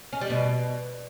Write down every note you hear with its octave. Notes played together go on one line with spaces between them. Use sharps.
C#4
G3
B2